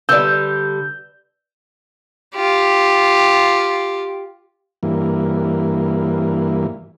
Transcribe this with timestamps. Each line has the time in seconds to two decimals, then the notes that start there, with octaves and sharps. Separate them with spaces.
0.09 D3 G3 B4 D5 E6 G6
2.36 F4 G4
4.83 G2 E3 A#3